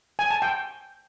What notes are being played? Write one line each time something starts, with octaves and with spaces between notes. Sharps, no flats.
G#5
A5
G5